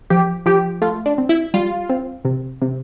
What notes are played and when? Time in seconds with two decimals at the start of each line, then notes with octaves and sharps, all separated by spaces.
0.10 F3 G4
0.46 F3 G4
0.82 A3 F4
1.06 D4
1.18 C4
1.29 E4
1.54 G3 F4
1.89 C4
2.25 C3
2.62 C3